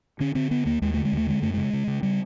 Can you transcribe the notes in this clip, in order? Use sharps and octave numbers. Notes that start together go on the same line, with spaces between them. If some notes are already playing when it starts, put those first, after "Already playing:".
D3 C#4
D3 C4
D3 B3
D#2 A#3
D#2 G#3
D3 A3
G#3
D#2 A3
D3 G#3
F#2 A3
C#3 G#3
C#3
C#3
C#3 G3